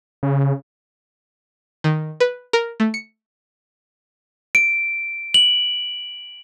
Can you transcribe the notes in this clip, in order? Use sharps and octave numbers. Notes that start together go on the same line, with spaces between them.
C#3
D#3
B4
A#4
A3
C#7
D7
F#7